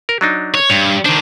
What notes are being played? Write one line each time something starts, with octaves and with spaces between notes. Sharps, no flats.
A#4
F#3 D4 D#4
C#5
G2 C#5
D#3 D4 C5